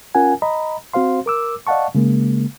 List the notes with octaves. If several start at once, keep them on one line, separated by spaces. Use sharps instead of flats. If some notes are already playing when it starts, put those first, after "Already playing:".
C#4 F4 A#4 F#5 G#5
D#5 A#5 B5
C4 F#4 C5 F5 C6
A#4 D6 E6
D5 D#5 F5 F#5 A5 C#6
C#3 G#3 A#3